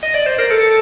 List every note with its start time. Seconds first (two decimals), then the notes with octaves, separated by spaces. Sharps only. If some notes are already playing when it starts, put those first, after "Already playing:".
0.03 D#5
0.14 D5
0.26 C5
0.39 A#4
0.50 A4